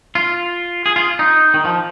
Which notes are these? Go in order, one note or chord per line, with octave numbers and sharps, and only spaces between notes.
F4
G#4
F4
D#4
D#3
F3